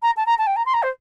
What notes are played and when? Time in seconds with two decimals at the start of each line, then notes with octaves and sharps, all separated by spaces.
0.02 A#5
0.17 A5
0.26 A#5
0.38 A5
0.47 G5
0.56 A#5
0.66 C6
0.74 A#5
0.83 C5